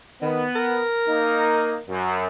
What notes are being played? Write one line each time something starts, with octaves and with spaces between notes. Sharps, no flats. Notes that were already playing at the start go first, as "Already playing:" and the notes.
D#3 B3
A#4
A#3 D#4
F#2